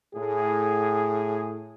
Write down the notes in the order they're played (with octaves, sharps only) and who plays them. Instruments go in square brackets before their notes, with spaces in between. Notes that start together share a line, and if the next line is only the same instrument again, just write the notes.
[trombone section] A2 G#4